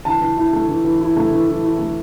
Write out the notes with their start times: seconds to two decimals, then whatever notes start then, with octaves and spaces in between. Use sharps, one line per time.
0.05 E3 A5
0.21 E3
0.37 E4
0.53 A3
0.68 E3
0.84 E3
1.00 E4
1.17 A3
1.32 E3
1.48 E3
1.64 E4
1.79 A3